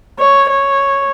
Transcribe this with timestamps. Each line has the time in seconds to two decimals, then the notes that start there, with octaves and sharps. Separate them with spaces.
0.19 C#5
0.50 C#5